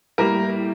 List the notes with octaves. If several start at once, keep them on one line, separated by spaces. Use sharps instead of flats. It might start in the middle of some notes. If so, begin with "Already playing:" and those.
A2 G3 A#3 A#4